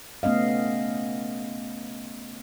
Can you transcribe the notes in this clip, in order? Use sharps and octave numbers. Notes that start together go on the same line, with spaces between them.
A3 B3 C#4 D#5 F5